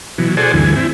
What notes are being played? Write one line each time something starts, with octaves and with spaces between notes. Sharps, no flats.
B2 E3 F#3
F#4 G#4 A4 C5 D5 G#5
D2 G2 E3 G#5
C4 E4